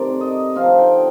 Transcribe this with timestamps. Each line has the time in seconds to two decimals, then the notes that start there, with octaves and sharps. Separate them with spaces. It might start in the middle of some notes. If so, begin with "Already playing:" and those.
Already playing: C3 D#3 A3 D5 A#5 C6
0.21 D#5
0.55 D3 F3 C4 D#4 F5
0.79 G5
0.92 G5